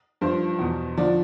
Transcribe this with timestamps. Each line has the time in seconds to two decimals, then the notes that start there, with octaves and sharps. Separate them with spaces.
0.21 G2 F3 C5
0.59 E2 B2
0.97 D3 F3 D5